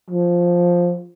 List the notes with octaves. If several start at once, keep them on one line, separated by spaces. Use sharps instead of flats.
F3